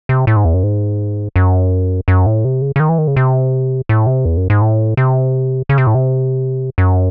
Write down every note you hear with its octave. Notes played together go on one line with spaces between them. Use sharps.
C3
A2
G#2
E2
F#2
G#2
F#2
F#2
A2
C3
C#3
C#3
D#3
E3
D#3
C#3
C3
A2
C3
E2
F#2
G#2
A2
C3
C#3
C3
A2
C3
F#2